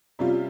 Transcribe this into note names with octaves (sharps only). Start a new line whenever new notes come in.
C3 G3 C#4 F4